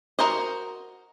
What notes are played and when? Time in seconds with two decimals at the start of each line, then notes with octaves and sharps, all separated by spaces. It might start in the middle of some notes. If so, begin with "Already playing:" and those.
0.19 F#4 A#4 C5 D#5